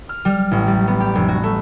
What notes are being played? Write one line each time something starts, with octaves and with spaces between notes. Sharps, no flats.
F6
G3
A1
G3
B3
G4
F1
F#4
A3